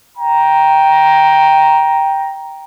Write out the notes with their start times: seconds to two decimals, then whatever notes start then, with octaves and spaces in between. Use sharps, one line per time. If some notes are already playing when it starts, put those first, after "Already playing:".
0.18 G5 A#5